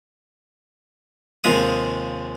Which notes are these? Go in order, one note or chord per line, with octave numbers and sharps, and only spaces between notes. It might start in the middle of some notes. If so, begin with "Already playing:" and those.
D#2 C3 F3 G#3 F5 D#6